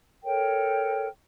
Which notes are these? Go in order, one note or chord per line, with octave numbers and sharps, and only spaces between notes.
A4 A#4 C#5 G5